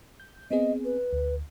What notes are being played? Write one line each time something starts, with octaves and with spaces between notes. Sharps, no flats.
G6
B3 C4 G#4 D#5
B4
D2